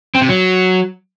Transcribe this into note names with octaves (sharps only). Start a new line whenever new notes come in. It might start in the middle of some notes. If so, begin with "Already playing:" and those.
C4
C3
F#3